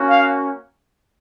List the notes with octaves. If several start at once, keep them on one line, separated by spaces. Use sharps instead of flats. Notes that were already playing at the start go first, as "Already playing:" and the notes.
Already playing: A#3 C#4 F#4
F5